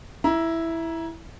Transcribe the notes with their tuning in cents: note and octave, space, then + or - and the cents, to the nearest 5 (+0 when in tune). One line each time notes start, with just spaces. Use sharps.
E4 +0 A#5 +30